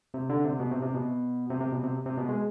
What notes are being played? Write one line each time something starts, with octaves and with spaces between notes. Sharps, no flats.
C3
D3
C3
B2
C3
C3
B2
C3
C3
B2
C3
C3
B2
G#3